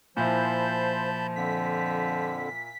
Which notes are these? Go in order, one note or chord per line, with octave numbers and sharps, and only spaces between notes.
A#2 F3 E4 C5 A5 B5 G6
F2 D3 B6